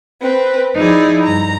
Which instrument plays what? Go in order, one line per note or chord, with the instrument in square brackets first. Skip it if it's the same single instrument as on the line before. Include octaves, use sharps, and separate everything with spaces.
[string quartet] C4 B4
F3 D#4 E4 G#4 D5
G2 A#5